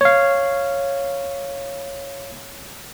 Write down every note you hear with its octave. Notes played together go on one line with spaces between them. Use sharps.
C#5 F5